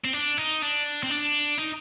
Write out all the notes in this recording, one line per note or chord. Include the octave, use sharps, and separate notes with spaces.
C4
D4
D#4
D4
C4
D4
D#4